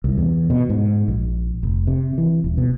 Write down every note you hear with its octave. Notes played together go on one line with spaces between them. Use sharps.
C2
E2
B2
G#2
A#1
F1
C3
E3
D#1
B2